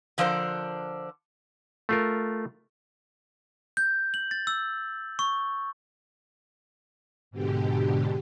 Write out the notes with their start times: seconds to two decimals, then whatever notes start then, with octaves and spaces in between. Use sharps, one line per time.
0.18 D3 F3 D4 A#4 C5
1.89 A3 F4 A#4
3.77 G6
4.14 F#7
4.31 A6
4.47 E6
5.19 C#6
7.31 G#2 B2 D3 G4